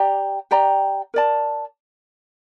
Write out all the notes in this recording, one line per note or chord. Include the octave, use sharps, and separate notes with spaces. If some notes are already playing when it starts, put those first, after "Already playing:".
Already playing: G4 D5 G5 A#5
G4 D5 G5 A#5
A#4 D5 A5